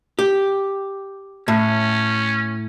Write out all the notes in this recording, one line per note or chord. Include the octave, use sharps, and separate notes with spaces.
G4
A2 C#4